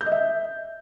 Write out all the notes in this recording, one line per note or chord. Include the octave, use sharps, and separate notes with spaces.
G6
D#5
E5